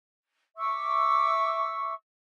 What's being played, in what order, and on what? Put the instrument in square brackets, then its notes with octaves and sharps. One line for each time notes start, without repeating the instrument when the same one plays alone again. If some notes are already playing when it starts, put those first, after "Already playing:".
[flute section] E5 C#6 D6 E6